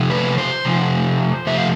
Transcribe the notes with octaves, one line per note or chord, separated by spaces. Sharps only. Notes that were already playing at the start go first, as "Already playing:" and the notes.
Already playing: C3 F3 A3
B4
C5
C3 F3 A3
C3 F3 A3 E5
F5